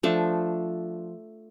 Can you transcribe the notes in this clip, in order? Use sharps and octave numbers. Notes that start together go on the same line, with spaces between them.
F3 A3 D4